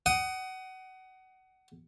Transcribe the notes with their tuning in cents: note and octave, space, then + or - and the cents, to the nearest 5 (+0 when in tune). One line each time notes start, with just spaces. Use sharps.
F#5 +25 D#6 +0